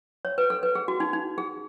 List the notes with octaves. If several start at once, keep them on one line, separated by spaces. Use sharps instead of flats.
C#5
B4
A4
B4
G#4
F#4
D#4
D#4
G#4